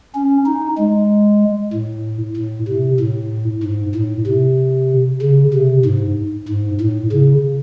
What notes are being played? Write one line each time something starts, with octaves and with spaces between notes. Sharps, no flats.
C#4
D#4
G#3
A2
A2
C3
A2
G#2
A2
C3
C#3
C3
G#2
G#2
A2
C#3